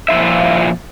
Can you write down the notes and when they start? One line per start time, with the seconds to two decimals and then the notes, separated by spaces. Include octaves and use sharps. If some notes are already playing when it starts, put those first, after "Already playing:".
0.09 A#2 F3 E4 F4 E5